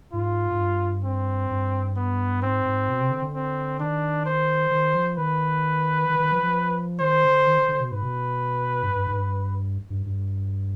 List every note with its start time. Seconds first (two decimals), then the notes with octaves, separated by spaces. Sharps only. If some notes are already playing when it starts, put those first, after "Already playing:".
0.13 G#2 F4
0.51 G#2
0.59 G2
1.05 C4
1.51 G2
1.96 B3
2.42 G#2 C4
2.65 G#2
2.89 B2
3.00 C3
3.11 D3
3.22 D3
3.34 C4
3.80 D#3 D4
4.26 C5
4.71 D#3
4.95 F3
5.17 D#3 B4
6.09 D#3
6.20 D#3
6.31 F3
6.43 F3
7.00 D#3 C5
7.24 D3
7.47 D#3
7.58 D3
7.68 D3
7.80 B2
7.91 G#2 B4
8.02 B2
8.83 G2
8.95 G2
9.07 G#2
9.18 G2
9.90 G2
10.06 G2